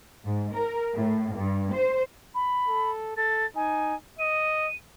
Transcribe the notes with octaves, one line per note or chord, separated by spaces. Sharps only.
G#2
A#4
A2
G2
C5
B5
A4
A4 A6
D#4 G#5
D#5 D#7